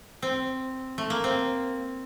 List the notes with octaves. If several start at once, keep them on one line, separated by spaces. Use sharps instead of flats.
C4
A3
A#3
C4